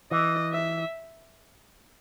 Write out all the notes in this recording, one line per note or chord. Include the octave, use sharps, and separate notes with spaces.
E3 D#5
E5